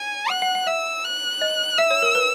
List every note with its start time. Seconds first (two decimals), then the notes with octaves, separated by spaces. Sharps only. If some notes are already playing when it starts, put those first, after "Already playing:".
Already playing: G#5
0.30 F#5 F#6
0.42 F#5
0.55 F#5
0.67 E5 E6
1.04 F#6
1.42 D#5
1.78 E5 E6
1.90 C#5
2.02 A#4
2.15 B4